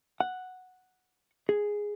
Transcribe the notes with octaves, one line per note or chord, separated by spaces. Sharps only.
F#5
G#4